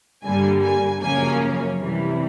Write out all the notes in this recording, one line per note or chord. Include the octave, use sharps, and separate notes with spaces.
G2 D3 G3 A#3 G#5
G#5
F#2 C#3 F3 A#3 C#4 G#5
C3 E3 G3